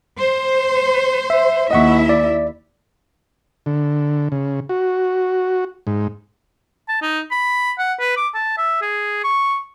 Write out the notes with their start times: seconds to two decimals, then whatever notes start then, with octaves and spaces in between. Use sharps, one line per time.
0.18 C5
1.30 E5
1.71 D#2 E4 D#5 E5 F#5 C#6
2.09 D5
3.66 D3
4.32 C#3
4.69 F#4
5.87 G#2
6.88 A5
7.02 D#4
7.31 B5
7.78 F#5
7.99 B4
8.17 D6
8.34 A5
8.58 E5
8.82 G#4
9.24 C#6